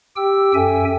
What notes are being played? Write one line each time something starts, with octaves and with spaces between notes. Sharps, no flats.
G4 G5 E6
F#2 A4 E5 G5 G#5